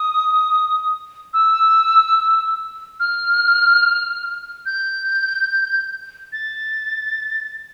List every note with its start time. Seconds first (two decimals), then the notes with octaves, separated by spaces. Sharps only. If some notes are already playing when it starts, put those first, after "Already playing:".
Already playing: D#6
1.33 E6
3.00 F6
4.66 G6
6.32 A6